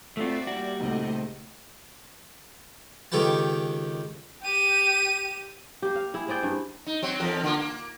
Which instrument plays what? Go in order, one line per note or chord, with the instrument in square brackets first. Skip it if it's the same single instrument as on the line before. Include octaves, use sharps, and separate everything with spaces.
[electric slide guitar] A3 F4 [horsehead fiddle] C4 F#4 [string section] D5 E5
[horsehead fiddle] G3 A#3 [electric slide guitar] F#4
[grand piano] C#2 A#2 D#4 [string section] A3 C4 D#5
[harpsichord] C#2 D#3 G4 A4 B4 A5
[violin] G4 D#7
[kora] A#3 G4
F5
E4 G#4
C4 G#4 D5 G5
G2
[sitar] D#4
F#3 C4
E2 F3 A#4
D3 A#3 F4
A#3